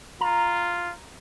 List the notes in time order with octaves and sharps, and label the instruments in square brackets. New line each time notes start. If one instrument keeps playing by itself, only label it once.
[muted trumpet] F4 [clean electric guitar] A#5